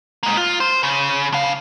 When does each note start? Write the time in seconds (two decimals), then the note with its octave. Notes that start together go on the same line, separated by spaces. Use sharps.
0.23 G#3 A#3
0.37 F4
0.60 C5
0.83 C#3
1.33 D4 F5